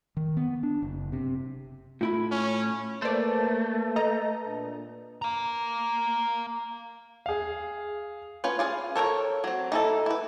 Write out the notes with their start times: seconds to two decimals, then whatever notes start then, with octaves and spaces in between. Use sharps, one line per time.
0.17 D#3
0.37 B3
0.63 D4
0.82 F#1
1.12 C3
2.01 A2 E4 F4 B5
2.31 C#4
3.02 A3 A#3 B4 C5 D5 A5
3.96 A4 D#5 A#5
4.47 A#2 D4
5.22 F5 A#5
7.26 G#4 F5
8.44 C#4 F4 B4
8.59 F4 G#4 F5
8.95 A4 A#4 C5 C#5
9.44 F#3 C4
9.72 D#4 E4 A4
10.06 E4 B4